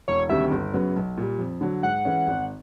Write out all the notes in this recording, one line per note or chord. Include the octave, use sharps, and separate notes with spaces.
E1 C#5
D2 C3 D#3 G3 E5
G1
F#2 C#3 F#3 B3
B1
A#2 G3
F2
D3 F#3
G#2 F#5
E3 G#3 C#4
G#1